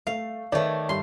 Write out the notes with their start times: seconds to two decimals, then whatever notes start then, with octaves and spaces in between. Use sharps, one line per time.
0.07 A3 F5
0.52 D#3 A3 B4 C#5 D5
0.89 G2 C6